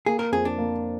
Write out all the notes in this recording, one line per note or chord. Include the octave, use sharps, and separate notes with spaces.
A#3 G#4
A#4
F2 G#4
D4
A#3